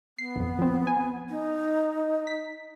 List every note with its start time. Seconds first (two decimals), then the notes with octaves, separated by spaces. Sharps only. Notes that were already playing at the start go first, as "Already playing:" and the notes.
0.19 B3 C7
0.36 A#1 F2
0.59 F3 C4
0.87 G#5
1.30 D#4
2.27 B6